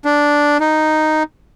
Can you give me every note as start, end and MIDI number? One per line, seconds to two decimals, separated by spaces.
0.05 0.58 62
0.60 1.23 63